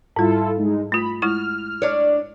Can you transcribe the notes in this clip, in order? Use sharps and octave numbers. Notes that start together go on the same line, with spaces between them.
G#2 G3 E4 F4 A4
G#3 D#4
A3 F4 B5
G#3 E4 C#6 F6
D4 C#5